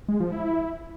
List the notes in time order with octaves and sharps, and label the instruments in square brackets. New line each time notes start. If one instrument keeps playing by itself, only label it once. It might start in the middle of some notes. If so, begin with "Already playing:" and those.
[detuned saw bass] G#3
F3
E4